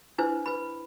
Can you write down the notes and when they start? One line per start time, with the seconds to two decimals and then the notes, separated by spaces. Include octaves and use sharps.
0.18 D4 E4 B4 C5
0.46 B4 B5